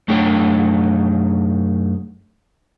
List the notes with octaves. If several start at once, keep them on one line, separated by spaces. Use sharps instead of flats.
F#2 A3 D4 G#4 C#5 G5